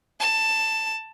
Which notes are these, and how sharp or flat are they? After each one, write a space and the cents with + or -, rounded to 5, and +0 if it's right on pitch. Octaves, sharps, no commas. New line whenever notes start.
A5 +10